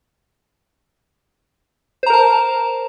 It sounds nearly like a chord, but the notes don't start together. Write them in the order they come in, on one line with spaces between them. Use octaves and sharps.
C5 A#5 A#4 A5